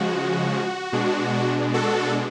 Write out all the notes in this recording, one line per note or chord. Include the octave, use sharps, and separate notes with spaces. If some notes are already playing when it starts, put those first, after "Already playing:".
Already playing: C#3 F3 G#3 F#4
B2 G#3 D4
F#4 A4